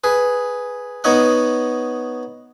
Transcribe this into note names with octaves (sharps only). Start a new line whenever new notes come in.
G#4 B4
B3 D#4 C#5 D#5 F#5